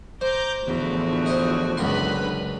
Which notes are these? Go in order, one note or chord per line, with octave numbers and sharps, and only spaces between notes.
C5 A#5 D6 G6
E2 A2 D3 F3 F#4
C5 D#5
C#2 F#2 D3 B4 B5 C6